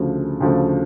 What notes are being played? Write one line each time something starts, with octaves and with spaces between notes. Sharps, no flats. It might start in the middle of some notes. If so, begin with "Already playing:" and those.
Already playing: D2 C#3 F3 A3
D2 C#3 F3 A3